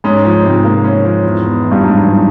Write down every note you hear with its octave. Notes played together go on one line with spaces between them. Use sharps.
G#2 C#4
F3
G#2
C3
A#3
C#4
F3
E2
B2
E2
G2
G#2 F#3
E2